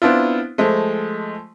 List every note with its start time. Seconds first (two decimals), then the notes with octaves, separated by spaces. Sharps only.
0.02 B3 C4 D4 E4 F4
0.58 F3 G#3 A3